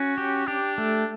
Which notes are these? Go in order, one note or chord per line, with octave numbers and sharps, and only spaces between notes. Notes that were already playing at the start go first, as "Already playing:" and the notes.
Already playing: C#4 F#4
G4
D4 G4
A3